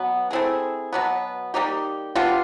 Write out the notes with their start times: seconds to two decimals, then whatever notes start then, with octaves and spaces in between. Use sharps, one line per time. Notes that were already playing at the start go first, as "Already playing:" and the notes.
Already playing: B2 F#3 B3
0.31 A3 C4 E4 G#4
0.93 B2 F#3 B3
1.54 G3 A#3 D#4 G4
2.15 G3 B3 D4 F4